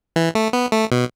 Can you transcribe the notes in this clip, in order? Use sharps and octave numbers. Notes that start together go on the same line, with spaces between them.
E3
A3
B3
A3
B2